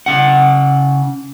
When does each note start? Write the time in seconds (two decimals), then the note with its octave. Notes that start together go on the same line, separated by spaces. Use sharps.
0.06 C#3 F#5